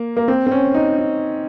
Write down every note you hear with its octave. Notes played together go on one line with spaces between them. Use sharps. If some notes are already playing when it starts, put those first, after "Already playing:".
Already playing: A#3
A#3
C4
C4
C#4
D#4
D#4